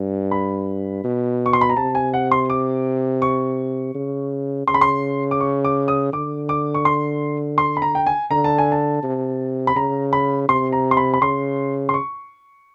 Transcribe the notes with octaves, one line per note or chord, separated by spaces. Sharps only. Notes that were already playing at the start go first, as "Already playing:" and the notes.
Already playing: G2
B5
B2
C#6
C6
B5
A#5
C3 A5
G#5
F#5
C6
D6
C#6
C#3
C#3 C6
B5
C6
D6
C#6
D6
D#6
D3 D6
D6
C#6
C6
C6
B5
A#5
G5
G#5
D3 A#5
A5
G#5
A5
C3
B5
C#3 A#5
B5
C3 C6
A#5
C6
B5
B5
C#3 C6
C6
C#6